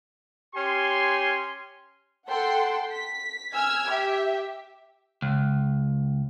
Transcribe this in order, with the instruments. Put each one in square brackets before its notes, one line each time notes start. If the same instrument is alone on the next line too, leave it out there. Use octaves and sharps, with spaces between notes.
[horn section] C#4 G4 G#5 C6
[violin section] A4 F#5 G5 C6
B6
G#5 E6 F6 G#6
G4 E5
[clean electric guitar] C#2